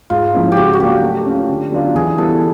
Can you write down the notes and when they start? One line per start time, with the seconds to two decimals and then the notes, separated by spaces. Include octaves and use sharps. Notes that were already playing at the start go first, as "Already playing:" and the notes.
0.10 G#2 F4
0.34 F3 A#3 C#4 E4
0.52 C#3 F#4 G4
0.73 F#4
0.80 F#3 A#3 D4 G4
1.03 A3
1.26 C#4 F4
1.49 D3
1.72 F#3 B3 D4 F4
1.95 E3 G#4
2.18 G3 B3 E4 A4